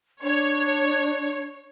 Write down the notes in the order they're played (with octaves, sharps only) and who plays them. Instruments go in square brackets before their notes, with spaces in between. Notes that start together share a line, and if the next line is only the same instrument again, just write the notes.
[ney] D4 [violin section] C#5